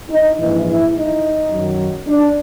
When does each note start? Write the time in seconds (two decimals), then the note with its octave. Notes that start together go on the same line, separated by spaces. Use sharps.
0.10 D#4
0.38 A#1 G#2 E3 E4
0.66 E4
0.94 D#4
1.51 F#2 D#3 F#3
2.08 D4